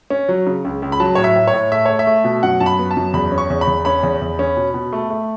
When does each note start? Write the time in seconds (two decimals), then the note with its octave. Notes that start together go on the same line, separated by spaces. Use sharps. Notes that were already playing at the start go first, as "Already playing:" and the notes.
0.10 C#4
0.29 F#3
0.47 C#3
0.65 C#2
0.82 C#2
0.92 B5
1.00 F#3 A5
1.15 A2 C#5
1.24 E5
1.36 A2
1.47 C#5
1.53 A2
1.72 A3 E5
1.86 A3 C#5
1.99 E5
2.07 A3
2.24 B2
2.43 F#2 F#5
2.60 F#2 A5
2.66 B5
2.79 B3
2.90 A5
2.97 F#2
3.13 E2 B5
3.32 C#4
3.38 C#6
3.50 E2
3.61 B5
3.67 E2
3.85 C#4 B5
4.03 E2
4.21 E2
4.39 C#4
4.57 B2
4.74 B2
4.93 A3
5.10 A3